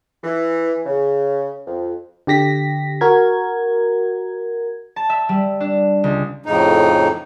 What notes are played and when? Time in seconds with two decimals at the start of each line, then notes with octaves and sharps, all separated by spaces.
0.23 E3
0.86 C#3
1.65 F2
2.27 D3 G4 A#6 B6
3.01 F#4 A#4 G#6
4.96 A5
5.09 E5
5.29 G3
5.60 D4
6.04 C#2
6.46 F2 A2 C#3 D#4